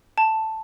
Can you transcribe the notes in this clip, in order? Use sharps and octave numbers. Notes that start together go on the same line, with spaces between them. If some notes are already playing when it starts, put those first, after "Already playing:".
A5